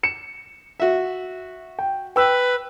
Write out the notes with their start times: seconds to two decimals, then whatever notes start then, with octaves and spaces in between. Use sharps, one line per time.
0.03 C#7 E7
0.80 F#4 E5
1.79 G5
2.16 B4 G5 E6